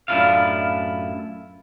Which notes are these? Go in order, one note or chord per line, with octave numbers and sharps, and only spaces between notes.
F#2 A2 D4 E4 F4 F5